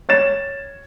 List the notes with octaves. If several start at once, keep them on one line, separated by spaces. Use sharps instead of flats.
C#5 A6 E7